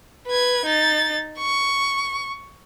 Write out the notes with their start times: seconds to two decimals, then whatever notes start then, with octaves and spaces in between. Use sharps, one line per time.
0.27 B4 G#6
0.66 D#4 A6
1.38 C#6